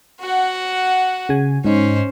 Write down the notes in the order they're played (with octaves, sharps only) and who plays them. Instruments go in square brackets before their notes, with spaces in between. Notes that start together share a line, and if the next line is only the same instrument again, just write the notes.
[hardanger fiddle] F#4 F#5
[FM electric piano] C#3 G#5
[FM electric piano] G#2 D#4 [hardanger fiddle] C#4 C5